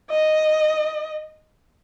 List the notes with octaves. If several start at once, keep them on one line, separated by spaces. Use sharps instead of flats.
D#5